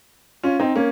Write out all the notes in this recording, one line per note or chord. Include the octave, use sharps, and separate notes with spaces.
C#4 F4
C4 D#4
A#3 C#4